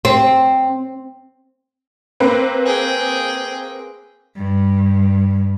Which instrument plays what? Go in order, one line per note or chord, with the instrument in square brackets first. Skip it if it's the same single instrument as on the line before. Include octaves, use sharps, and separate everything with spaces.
[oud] C4
[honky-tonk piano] A#3 C4 B4
[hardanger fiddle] G#4 G5
[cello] G2